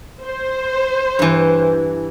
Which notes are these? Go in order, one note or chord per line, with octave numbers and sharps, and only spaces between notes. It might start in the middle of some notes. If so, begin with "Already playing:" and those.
C5
G2 E3